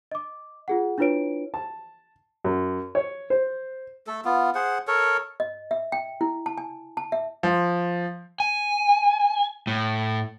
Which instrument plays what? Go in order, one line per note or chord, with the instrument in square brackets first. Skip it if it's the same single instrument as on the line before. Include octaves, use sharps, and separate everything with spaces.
[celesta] D#5 D6
F4 G#4 F#5
D4 E4 F4 B4 C#5 D7
[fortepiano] A5
F#2
C#5
C5
[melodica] A3 A4
B3 F4
G#4 C5 F#5
A4 A#4 C#5
[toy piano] D#5
E5
G5
E4
A5
G#5
A5
E5
[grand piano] F3
[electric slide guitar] G#5
A2